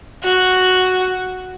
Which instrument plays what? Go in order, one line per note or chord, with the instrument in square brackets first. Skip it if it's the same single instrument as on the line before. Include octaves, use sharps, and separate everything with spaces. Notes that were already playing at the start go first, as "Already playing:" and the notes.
[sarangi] F#4